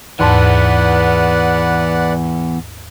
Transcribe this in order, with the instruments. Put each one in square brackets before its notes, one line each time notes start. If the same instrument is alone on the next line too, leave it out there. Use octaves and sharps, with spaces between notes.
[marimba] D#2 G#2 A5 [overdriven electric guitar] E3 B3 [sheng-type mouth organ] B4 D5 F#5